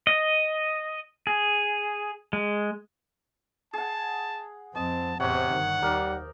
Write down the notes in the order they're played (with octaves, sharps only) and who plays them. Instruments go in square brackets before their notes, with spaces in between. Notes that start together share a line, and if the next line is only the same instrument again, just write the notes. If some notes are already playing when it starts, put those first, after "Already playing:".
[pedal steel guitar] D#5
G#4
G#3
[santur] G#4 F#5 [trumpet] A5
[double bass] F2 C4 [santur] D#5 [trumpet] A5
[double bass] A1 E2 [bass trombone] C3 [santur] C5 C#5 [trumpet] F#5
[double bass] G1 D#3
[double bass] D#2 [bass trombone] G3 [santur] D#4 A#4 D5